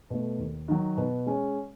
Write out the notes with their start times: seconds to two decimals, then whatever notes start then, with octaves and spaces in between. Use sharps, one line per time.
0.10 B2 A3
0.38 D#2
0.68 D#3 F#3
0.97 B2
1.26 G#3 C#4